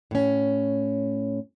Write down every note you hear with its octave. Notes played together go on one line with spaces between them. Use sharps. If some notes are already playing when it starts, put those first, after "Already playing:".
A2 C#4